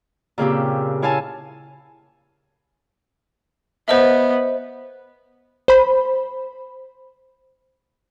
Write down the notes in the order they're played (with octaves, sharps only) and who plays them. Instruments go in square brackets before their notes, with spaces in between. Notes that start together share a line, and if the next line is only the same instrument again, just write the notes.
[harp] A#2 C#3 C4 G4
E4 C#5 F5 G#5 A5
[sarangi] B3 [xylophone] C5 D#5 E5
[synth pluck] C5 B5